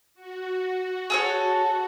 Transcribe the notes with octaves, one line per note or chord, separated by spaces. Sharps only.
F#4
G#4 A4 C#5